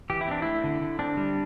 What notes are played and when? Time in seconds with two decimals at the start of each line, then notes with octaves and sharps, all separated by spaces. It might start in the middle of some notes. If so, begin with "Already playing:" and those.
0.10 E3 G4
0.21 E4
0.27 C4 D4
0.42 A3 E4
0.64 D3
0.81 D3
0.99 C4 D4
1.17 G3